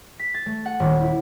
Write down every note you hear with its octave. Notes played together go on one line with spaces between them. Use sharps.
B6
A6
A3
F#5
D#1
E4